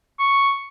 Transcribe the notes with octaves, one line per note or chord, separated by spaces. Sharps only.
C#6